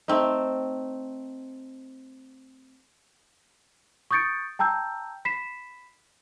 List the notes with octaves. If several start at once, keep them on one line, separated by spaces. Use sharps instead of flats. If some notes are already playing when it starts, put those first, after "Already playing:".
A3 C4 D#4
C#6 D#6 G6 A6 C#7 D7
G5 A5 A#5 E6 G6
B5 B6 C7 E7